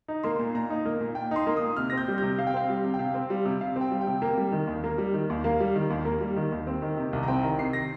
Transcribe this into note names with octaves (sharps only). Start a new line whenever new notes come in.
D#4
A#3 C6
A#2
A#2 A#5
D#4
A#3
A#2
A#2 G5
D#4 C6
A#3
D#6
A#2
C3 F6
C4 A#6
G6
G3
G6
C3
C3 F5
G5
C4 F5
G3
C3
G5
C3 F5
C4
G3
C3
C3 F5
C4
G5
G3
G5
C3
A#3
G3
D#3
D#2
A#3
G3
D#3
D#2
A#3 F5
G3
D#3
D#2
A#3
G3
D#3
D#2
C4
D#3
C3
C2
A#5
C4 G5
D#3 A#5
C3 C7
A#6